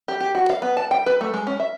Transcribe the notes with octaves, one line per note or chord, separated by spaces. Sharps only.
G4
G4
F#4
F5
B3
A5
G5
B4
A3
G#3
C#4
E5